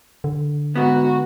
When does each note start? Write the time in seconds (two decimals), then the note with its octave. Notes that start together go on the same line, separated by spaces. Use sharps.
0.24 D3
0.76 G#2 B3 F#4